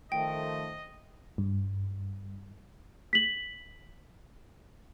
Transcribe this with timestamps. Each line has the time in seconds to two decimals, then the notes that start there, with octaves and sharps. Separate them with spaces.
0.12 D#3 F3 A3 D#5 G5
1.38 G2
3.13 B6 F#7